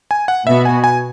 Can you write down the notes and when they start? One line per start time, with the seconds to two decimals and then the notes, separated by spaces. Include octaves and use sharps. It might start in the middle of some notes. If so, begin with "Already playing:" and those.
0.11 G#5
0.28 F#5
0.47 B2 B3 F#4 E5
0.65 G#5
0.84 G#5